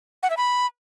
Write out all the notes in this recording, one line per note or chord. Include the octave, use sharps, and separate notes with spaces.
F#5
E5
B5